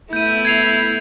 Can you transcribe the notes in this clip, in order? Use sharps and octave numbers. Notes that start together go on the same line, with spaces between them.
A3 B3 E4 G6 D#7
G#6 C7 F7